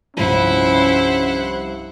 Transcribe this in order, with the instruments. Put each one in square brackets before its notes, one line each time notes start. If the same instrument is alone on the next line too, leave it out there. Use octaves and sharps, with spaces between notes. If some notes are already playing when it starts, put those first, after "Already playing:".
[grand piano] C2 G2 F3 [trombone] C#4 [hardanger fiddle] E4 [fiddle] C5 F#5